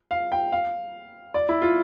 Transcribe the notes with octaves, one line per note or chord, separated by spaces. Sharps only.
F5
G5
F5
D5
E4
F4